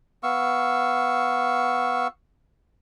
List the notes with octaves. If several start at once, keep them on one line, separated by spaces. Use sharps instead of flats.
B3 F5 C#6 E6